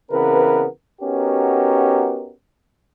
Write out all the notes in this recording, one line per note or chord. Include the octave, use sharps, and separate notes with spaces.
C#3 E3 B3 C4 A#4 B4
B3 C#4 D#4 F#4 G4 A#4